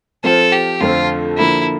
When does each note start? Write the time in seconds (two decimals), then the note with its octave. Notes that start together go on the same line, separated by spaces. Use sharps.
0.24 F3 C4 F4 A4 C5
0.52 G4
0.81 F2 D3 F3 A3 C4 F4
1.38 D3 F3 A#3 E4